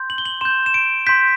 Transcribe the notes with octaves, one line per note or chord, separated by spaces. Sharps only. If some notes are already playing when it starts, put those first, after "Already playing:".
Already playing: C6 G6
F#7
G7
F#7
C6 G6 E7
E7
D7
C6 G6 B6